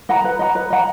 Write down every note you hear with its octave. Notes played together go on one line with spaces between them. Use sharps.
D#5 F#5 A#5
B4
D#5 F#5 A#5
B4
D#5 F#5 A#5